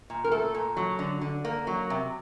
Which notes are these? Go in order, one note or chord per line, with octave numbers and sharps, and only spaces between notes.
A#2
A#4
A3 A4
A#2
F#3
D3
D3
A#3
F#3
C3